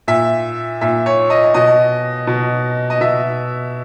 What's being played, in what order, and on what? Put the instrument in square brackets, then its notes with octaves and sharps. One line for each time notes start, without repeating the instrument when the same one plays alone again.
[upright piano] A#2 E5
A#2 E5
C#5
D#5
B2 D#5
B2
D#5
B2 E5